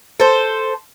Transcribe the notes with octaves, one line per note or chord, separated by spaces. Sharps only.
A4 C5